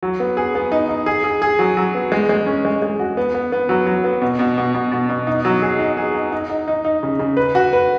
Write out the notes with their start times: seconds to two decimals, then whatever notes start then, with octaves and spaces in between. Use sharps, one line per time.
0.03 F#3
0.20 B3
0.37 G#4
0.55 B3
0.72 D#4
0.89 D#4
1.06 G#4
1.24 G#4
1.42 G#4
1.59 F#3
1.77 F#3
1.95 B3
2.12 G#3
2.29 G#3
2.46 C#4
2.65 G#3
2.82 G#3
2.99 F#4
3.17 B3
3.35 B3
3.52 B3
3.69 F#3
3.87 F#3
4.04 B3
4.22 B2
4.39 B2
4.58 B2
4.74 B2
4.92 B2
5.09 B2
5.27 D#4
5.45 F#3
5.62 G#4
5.79 D#4
5.97 G#4
6.14 D#4
6.32 D#4
6.50 D#4
6.68 D#4
6.85 D#4
7.03 C#3
7.19 C#3
7.37 B4
7.55 F#4
7.73 B4